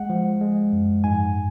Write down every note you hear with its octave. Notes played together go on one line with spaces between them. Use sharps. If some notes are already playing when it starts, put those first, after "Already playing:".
Already playing: G#3 F#5
F3
G#3
F#2
G#2 G#5